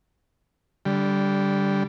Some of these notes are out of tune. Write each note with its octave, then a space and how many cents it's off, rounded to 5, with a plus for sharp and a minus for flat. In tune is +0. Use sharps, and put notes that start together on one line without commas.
D3 -15 G3 +0